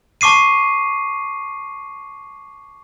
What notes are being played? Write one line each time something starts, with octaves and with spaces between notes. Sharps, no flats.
A5 C#6 D6 C7 D#7